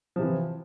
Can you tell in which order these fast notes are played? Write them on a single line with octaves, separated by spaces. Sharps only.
F3 C3 E3